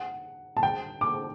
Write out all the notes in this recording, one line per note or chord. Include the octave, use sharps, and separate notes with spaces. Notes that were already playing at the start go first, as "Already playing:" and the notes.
Already playing: F#5
A5
G5
D6